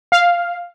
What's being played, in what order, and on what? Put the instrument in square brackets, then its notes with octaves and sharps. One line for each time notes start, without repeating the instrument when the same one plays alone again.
[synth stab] F5